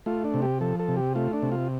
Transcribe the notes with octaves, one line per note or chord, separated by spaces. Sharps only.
A3 F4
D4
C3
G4
F3 A4
A4
C3
G4
A3 F4
D4
C3
F4